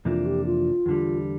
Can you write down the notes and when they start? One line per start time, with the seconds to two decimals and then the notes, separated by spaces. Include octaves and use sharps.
0.05 F2 C3 E3 A#3 D4 F4
0.26 G4
0.46 F4
0.86 E2 D3 G3